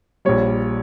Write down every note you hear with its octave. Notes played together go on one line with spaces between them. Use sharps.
A#1 A#2 G3 C#5